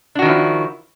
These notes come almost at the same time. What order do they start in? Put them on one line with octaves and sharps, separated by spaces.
D4 F#4 D#3 F3 E4